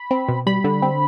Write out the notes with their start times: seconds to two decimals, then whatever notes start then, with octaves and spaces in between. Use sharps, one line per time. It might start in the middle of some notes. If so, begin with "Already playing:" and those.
Already playing: B5
0.11 C4
0.29 B2
0.47 G3 B5
0.64 D3
0.82 C4